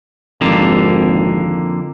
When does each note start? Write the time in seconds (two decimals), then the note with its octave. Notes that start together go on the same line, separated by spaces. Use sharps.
0.41 G#1 F2 D3 A#3